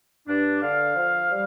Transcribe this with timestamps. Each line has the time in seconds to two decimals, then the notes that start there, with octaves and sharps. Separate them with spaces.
0.27 G2 D4
0.61 D3 F5
0.96 F3
1.30 G3